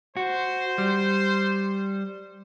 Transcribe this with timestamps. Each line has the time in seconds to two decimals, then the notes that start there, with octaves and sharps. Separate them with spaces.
0.17 F#4 C5
0.78 G3